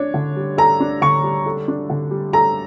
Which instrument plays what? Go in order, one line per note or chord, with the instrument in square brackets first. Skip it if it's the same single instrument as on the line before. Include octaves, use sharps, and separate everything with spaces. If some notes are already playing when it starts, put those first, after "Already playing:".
Already playing: [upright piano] D4 [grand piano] C#5
[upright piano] D3
G3
[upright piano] A4 [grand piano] A#5
[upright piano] D4
[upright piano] D3 [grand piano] C#6
[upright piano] G3
A4
D4
D3
G3
[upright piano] A4 [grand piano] A#5